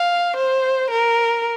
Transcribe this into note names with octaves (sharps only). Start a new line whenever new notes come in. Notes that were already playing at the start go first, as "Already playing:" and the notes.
Already playing: F5
C5
A#4